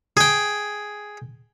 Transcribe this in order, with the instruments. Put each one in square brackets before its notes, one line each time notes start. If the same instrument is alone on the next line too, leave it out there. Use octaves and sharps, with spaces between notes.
[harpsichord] G#4 G5